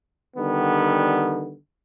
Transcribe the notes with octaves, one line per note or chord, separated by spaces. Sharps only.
D3 D#3 G3 B3